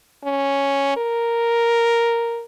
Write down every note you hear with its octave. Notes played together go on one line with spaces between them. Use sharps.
C#4
A#4